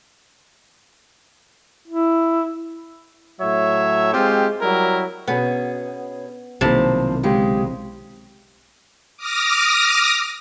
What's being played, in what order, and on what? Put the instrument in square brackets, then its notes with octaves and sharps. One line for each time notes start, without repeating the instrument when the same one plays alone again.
[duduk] E4
[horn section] A2 F#3 C#5 E5
G#3 C4 F4 G4
F#3 G3 E4 A#4
[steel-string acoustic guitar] B2 C#4 G#4 [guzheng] B3
[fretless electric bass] B1 D#3 [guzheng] C3 E4 A5 [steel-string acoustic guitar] F3 A#3
[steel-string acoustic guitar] C#3 G#3 G4
[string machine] D6 D#6 F6 A#6